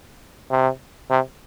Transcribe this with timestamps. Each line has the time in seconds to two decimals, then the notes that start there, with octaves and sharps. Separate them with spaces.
0.51 C3
1.10 C3